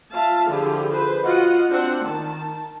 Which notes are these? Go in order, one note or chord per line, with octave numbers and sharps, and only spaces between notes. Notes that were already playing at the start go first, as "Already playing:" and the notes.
F4 E5 F5 A5
D3 F3 E4 F4 G4 G#4
G#4 B4 C5
F4 F#4 D#5 F#5
C4 D4 F#5
D#3 A5